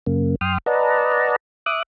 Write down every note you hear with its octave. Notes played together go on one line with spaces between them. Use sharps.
F#2 C#3 A#3
F#2 G5 C6 D#6 F6
B4 D5 D#5 F#5 A5 A#5
E5 D6 D#6 F#6